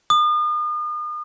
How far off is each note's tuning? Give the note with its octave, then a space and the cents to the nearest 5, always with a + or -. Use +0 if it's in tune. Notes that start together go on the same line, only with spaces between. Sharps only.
D#6 -40